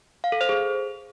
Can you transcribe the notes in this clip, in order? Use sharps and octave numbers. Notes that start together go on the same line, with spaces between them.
F5
A4
C5
G#4